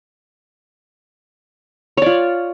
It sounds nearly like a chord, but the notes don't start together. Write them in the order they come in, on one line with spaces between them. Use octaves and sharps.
C#5 D5 F4